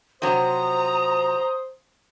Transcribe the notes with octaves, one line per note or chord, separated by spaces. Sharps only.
C3 F3 F#3 C5 A#5 D#6